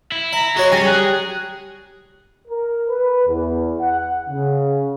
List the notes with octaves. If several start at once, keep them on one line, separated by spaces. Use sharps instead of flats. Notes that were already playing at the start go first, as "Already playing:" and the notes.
E4
E5 A#5
G#3 F#4 C#5 C6
G3 C#4 G#5
G#4 F#6
A#4
B4
E2
F#5
C#3